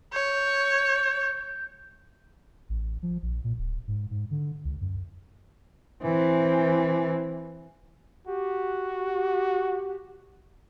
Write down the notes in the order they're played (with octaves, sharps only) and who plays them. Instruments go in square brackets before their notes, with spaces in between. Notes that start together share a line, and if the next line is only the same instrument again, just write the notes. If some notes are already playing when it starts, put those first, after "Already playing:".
[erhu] C#5 [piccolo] G6
[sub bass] A1
F3
A#1
A#2
D1
G#2
G#2
D3
C#2
F#2
[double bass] E3 C4
[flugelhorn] F#4 [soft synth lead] G4